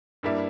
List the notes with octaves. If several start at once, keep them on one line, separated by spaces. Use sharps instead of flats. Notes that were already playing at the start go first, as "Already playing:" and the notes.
G2 G3 A#3 E4